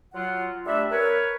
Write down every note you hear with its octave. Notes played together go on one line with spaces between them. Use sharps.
F#3 F4 F#5
G3 A3 D4 E5
A#4 B4 C#5